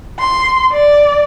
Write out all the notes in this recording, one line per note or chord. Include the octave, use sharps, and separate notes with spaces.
C6
D5